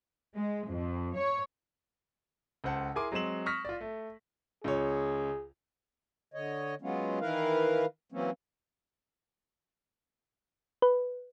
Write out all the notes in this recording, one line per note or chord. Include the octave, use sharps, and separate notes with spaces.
G#3
F2
C#5
C#2 A4 C5 F#5 A5
E4 G#4 A#4 G#5 C6 D6
F#3 G#3 C4 C6 E7 F#7
C#6 D#6 F6 A#6 B6
F4 D5
A3
C#2 G#4 C#5
D3 C#5 D#5
F#3 G#3 B3 C#4 F4
D#3 E3 E4 A#4 B4 F5
E3 F#3 A#3 C4 C#4
B4